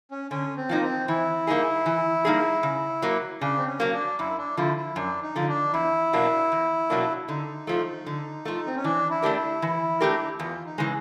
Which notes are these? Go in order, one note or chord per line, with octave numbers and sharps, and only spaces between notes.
C#4
D3 C#4
C4
F3 A#3 D#4
C4
E3 E4
G3 A#3 D#4 G#4
E3
G3 A#3 D#4 G#4
C#3
F#3 A#3
C#3 D4
C4
C#4
F#3 A#3
D4
F#2 E4
D4
D3 F3 E4
E4
F#2 D4
D#4
D3 F3
D4
E2 E4
B2 F#3 A#3 D4
E2
B2 F#3 A#3 D4
D3 D#4
F3 A3
D3
F3 A3
C4
C#4
E3 D4
E4
A3 D4 G4 A#4
E4
E3
A3 D4 G4 A#4
E2 F4
D#4
C#3 E3 G#3